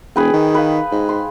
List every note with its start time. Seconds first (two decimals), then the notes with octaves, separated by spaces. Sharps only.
0.16 E1 G#4 B4 G5
0.33 D#3
0.55 B4 F5
0.92 G#2
1.09 C6